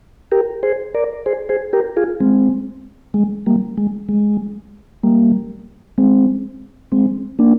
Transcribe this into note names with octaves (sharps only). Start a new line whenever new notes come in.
G4 A#4
G#4 C5
A#4 D5
G#4 C5
G#4 C5
G4 A#4
F4 G#4
G#3 C4
G#3
G3 A#3
G#3
G#3
G3 A#3
G#3 C4
G#3 C4
A#3 D4